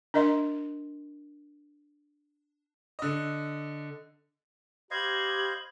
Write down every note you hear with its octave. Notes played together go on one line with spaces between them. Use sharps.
D4 A#4 D#5 E5 C6
D3 D#5
G4 C5 D#5 F5 B5 G#6